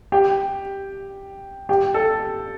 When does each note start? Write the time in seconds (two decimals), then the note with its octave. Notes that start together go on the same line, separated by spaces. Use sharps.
0.12 G4
1.69 G4
1.94 A4